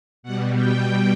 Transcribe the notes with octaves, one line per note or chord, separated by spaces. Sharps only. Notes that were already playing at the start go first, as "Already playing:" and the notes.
B2 G3 F#5
G5